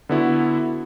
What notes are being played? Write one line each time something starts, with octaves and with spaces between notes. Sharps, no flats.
D3 B3 E4 F#4